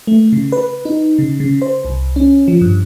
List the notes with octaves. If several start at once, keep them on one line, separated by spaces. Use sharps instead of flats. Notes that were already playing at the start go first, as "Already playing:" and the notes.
A3
C#3
B4
D#4
C#3
C#3
C5
C2
C#4
F3
G2